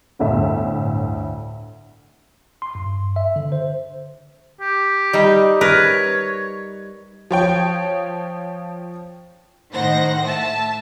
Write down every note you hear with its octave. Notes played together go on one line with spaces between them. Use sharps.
G1 D2 A2 E5
C6
G2
E5
D3
C5
G4
G3 D#4
A#4 B4 C#5
F3 C#5 G5
A2 D#3 C5 F#5 A#6
A3 E5 A5